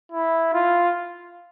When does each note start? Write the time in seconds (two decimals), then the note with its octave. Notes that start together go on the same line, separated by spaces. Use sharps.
0.12 E4
0.53 F4